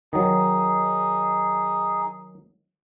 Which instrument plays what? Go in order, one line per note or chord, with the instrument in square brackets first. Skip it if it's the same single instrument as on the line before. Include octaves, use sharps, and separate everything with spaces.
[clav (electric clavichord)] D#3 F#3 [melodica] D#4 G#4